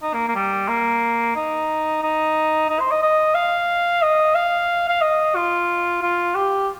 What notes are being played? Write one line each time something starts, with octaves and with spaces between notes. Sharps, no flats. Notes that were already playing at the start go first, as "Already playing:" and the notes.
D#4
A#3
A#3
G3
A#3
D#4
D#4
D#4
C5
D#5
D#5
F5
D#5
F5
F5
D#5
F4
F4
G4